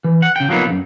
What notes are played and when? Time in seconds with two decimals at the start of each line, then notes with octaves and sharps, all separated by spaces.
0.04 E3
0.22 F#5
0.36 C#3 G5
0.49 F3 F#3 A#3 B3 D#4
0.66 B1 F#2